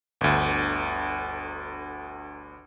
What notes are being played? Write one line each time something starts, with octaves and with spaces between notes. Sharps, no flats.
G1 D2